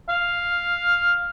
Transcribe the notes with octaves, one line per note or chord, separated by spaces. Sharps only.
F5